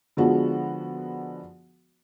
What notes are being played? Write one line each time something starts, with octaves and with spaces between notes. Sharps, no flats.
D3 F3 G#3 B3 F#4